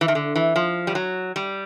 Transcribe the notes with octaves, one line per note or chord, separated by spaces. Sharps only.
E3
D#3
D3
E3
F3
G3
F#3
G3